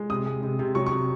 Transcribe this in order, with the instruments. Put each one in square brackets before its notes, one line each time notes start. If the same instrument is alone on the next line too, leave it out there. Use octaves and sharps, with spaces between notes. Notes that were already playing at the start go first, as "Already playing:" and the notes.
Already playing: [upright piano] G#3
C3 D#6
G#3
C3
C3
F#3 C#6
C#6
C3